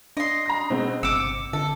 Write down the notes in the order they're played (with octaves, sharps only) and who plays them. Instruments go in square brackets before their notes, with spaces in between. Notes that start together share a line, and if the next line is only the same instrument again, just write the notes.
[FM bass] D4 [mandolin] D#5 C6
[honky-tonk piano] A#5 A#6
B2 G#3 C4
[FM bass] G1 [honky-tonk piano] C3 C#7 [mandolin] D6 E6
[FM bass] D3 [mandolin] A4